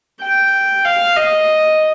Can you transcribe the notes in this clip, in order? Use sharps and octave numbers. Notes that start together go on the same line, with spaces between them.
G5
F5
D#5